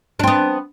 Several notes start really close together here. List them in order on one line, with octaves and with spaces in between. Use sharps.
D4 C4 B3